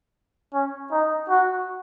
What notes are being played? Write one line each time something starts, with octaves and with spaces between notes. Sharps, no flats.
C#4
D#4
F#4